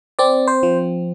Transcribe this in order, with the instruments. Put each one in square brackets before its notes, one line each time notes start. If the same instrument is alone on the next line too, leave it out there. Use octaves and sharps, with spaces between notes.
[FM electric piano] C4 D5
C5
F3